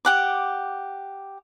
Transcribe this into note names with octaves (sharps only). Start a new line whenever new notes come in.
G4 F#5 D6